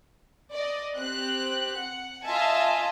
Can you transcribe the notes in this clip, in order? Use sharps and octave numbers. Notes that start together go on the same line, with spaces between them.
D5 D#5
C4 G4 F#6
F#5
F4 D#5 E5 G#5 A5